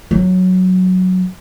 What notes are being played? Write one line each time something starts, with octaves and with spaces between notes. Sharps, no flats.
F#3